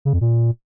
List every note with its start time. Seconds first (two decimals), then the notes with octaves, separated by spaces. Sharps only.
0.05 C#3
0.13 F2
0.21 A#2